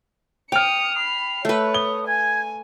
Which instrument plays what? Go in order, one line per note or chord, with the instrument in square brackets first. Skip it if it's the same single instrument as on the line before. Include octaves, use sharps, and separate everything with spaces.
[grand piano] G5 F6 [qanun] D6 [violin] D#6 C#7 [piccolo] F7
[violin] B5 C7
[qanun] A3 B4 [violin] C#5
[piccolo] D#6 [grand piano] G7
[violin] G#5 [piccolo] G#6